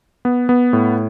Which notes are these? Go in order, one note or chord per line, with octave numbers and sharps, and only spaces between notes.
B3
B3
A2